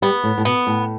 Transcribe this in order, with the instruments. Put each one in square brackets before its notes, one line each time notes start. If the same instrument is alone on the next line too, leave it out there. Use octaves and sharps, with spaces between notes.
[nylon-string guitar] G3 [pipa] B3
[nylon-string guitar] A2
A2
[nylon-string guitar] B2 [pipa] B3
[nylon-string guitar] A2